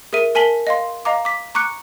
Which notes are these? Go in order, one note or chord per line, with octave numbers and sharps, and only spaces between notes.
G#4 A#4 E5 D#7
A#4 G#5 A5 B6 F#7 G7
D#5 F5 C6
D#5 F5 A#5 D6
D6 B6
A#5 C#6 D6 F#6 C#7